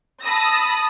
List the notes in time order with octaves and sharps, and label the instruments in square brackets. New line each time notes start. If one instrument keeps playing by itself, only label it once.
[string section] A5 B5 D#6 E6 A#6